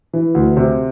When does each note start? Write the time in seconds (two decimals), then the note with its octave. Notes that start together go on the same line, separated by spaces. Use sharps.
0.13 E3
0.35 D2
0.57 C3